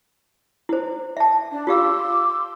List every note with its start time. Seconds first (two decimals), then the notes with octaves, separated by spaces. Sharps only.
0.69 E4 C5
1.17 E5 A5
1.51 D4
1.67 F4 G4 F5 C6 D6 E6